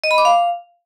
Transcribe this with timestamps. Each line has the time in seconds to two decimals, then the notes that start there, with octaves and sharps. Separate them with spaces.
0.04 D#5
0.11 B5
0.18 D6
0.25 F5